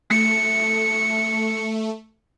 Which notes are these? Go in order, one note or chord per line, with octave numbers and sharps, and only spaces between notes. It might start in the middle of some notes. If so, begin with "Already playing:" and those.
A3 C#7